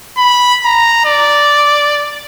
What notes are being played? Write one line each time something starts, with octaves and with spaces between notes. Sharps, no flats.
B5
A#5
D5